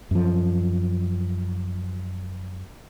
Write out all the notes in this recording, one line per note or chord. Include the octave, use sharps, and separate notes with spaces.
F#2 F3